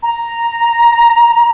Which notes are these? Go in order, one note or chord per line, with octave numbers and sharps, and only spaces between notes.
A#5